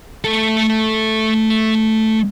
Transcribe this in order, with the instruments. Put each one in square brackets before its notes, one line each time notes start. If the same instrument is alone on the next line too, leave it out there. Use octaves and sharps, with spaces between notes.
[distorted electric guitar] A3 A4